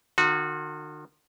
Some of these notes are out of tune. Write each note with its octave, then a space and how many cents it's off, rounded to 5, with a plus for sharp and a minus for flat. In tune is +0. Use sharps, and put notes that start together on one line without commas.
D#3 -45 F#4 -25